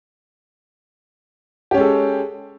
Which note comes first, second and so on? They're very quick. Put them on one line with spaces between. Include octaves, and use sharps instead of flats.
G4 C#4 G#3 A4